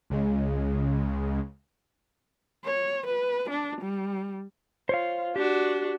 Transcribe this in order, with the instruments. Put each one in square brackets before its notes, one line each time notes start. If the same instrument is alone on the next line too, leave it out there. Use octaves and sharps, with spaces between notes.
[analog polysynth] C#2 C#3 G#3
[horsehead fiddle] C#5
B4
D4
G3
[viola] F4 [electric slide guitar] C5 C#5 F5
[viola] D4 F#4 [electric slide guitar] G4